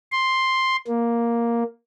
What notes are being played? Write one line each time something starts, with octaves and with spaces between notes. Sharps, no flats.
C6
A#3